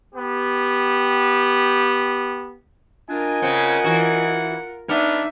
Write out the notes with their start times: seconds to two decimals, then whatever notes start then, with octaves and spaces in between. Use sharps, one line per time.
0.15 B3 G4
3.10 D4 F4 A#4 D#5 G#5
3.42 C#3 C4 F#5
3.84 E3 F#4
4.89 B3 D4 D#4 E5 F6